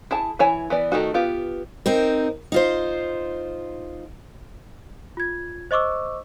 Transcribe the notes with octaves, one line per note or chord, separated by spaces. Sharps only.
E4 G#4 A5
E3 E4 C#5 G#5
E3 B3 D5
D#3 A3 D#4 F#4
B3 F4 G4
C4 D#4 A#4
D#4 F4 C5
F4 G#6
C5 D#5 C#6 D6 E6